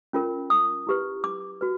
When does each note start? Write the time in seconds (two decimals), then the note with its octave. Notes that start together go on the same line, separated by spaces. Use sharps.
0.13 C#4 F4 A#4
0.50 D#6
0.87 E4 G4 B4
1.24 D6
1.61 F#4 B4